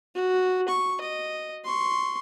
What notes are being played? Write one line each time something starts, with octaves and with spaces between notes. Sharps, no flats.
F#4
C#6
D#5
C6 C#6